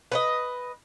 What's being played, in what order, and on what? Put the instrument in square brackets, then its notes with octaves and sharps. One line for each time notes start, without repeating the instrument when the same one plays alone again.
[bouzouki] B4 C#5 D#5